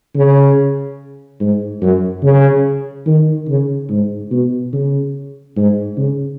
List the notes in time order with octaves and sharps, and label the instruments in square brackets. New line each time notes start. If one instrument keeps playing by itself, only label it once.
[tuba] C#3
G#2
F#2
C#3
D#3
C#3
G#2
B2
C#3
G#2
C#3